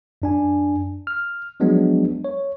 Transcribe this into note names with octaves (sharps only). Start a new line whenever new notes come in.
F#2 D4 G#5
F6
F3 F#3 G#3 B3 D4
C#5